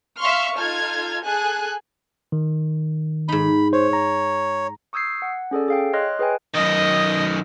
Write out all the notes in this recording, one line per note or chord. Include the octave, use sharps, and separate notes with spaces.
E5 F5 C6 C#6 F6
D#4 F4 A4 F6 G#6
G#4 A4 G#5 F#6
D#3
G#2 D#4 B5
C5 C#5
A#5
C#6 D#6 E6 G6 G#6 C7
F#5
C#4 G#4 A4 D5
G#4 F5 G5
C#5 D#5 C6 F6 F#6 A#6
G#4 B4 D#5 G5 G#5
F#2 D#3 D#5